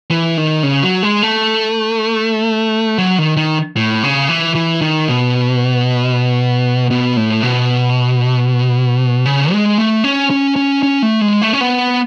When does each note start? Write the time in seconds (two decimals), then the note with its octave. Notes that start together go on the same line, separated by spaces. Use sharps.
0.11 E3
0.37 D#3
0.63 C#3
0.83 F#3
1.03 G#3
1.23 A3
2.98 F#3
3.18 D#3
3.37 D#3
3.77 A2
4.03 C#3
4.29 E3
4.55 E3
4.81 D#3
5.08 B2
6.91 B2
7.17 A2
7.43 B2
9.26 C#3
9.52 G#3
9.78 A3
10.04 C#4
10.30 C#4
10.56 C#4
10.83 C#4
11.03 A3
11.21 G#3
11.42 A3
11.53 C#4
11.61 B3